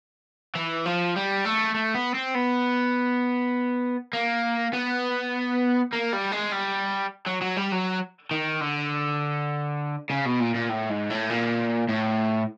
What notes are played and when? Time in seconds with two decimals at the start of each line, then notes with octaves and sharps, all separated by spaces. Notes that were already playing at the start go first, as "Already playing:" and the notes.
0.55 E3
0.86 F3
1.16 G3
1.45 A3
1.74 A3
1.94 B3
2.14 C4
2.35 B3
4.13 A#3
4.73 B3
5.93 A#3
6.13 G3
6.32 G#3
6.52 G3
7.26 F#3
7.41 F#3
7.57 G3
7.72 F#3
8.31 D#3
8.61 D3
10.10 C#3
10.25 B2
10.40 A#2
10.54 A#2
10.69 A2
10.89 G#2
11.10 A2
11.30 A#2
11.89 A2